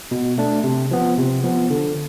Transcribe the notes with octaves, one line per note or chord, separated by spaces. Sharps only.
B2
A3 D4
C3
F3 B3
C3
F3 B3
D3